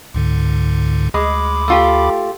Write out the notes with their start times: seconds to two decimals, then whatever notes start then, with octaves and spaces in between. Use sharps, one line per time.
0.14 C#2 G#2 D3
1.14 D2 G#3 B5 D6
1.68 A3 F4 G4